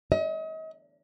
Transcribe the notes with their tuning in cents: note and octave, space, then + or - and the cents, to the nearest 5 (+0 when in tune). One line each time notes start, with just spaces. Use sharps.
D#5 +40